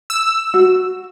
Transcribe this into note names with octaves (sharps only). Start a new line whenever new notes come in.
E6
F#4